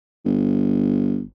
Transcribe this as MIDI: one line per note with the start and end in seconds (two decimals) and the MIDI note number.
0.25 1.23 31